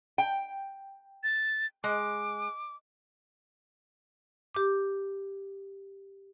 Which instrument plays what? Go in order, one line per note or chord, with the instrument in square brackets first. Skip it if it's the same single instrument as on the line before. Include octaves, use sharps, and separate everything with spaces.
[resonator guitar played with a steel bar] G5
[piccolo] A6
[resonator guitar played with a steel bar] G#3 [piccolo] D6
[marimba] G4 D6